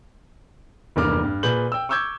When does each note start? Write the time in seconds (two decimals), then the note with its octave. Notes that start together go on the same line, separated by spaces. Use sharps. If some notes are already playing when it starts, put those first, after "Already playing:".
0.96 F1 E2 G2 A#3 D6 F6
1.24 G2
1.43 A#2 G#4 B4 G6 F#7
1.72 G5 E6
1.89 C#6 D6 E6 G6 G#6